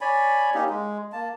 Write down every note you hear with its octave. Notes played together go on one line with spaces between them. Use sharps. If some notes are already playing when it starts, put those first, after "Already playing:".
C#5 D5 G#5 B5
A#3 C#4 D#4 G4
G#3
A#3 A5